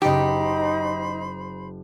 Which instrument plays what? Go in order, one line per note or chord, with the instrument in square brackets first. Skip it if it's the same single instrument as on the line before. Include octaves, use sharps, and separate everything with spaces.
[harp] F#1 D6 [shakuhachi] D#4 [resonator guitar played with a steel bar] G4 [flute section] C5 B5